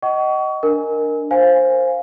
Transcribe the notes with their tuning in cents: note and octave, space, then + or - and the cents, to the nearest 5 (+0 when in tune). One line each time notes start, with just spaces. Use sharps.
D#5 +0 F#5 +40 C#6 +30
D4 +0 A#4 +0 G#5 +0
C5 +10 F5 +0 G#5 -10